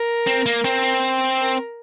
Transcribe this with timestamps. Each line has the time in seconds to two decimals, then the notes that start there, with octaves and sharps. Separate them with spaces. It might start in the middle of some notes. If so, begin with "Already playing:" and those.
Already playing: A#4
0.27 C4
0.46 A#3
0.64 C4
1.39 A#4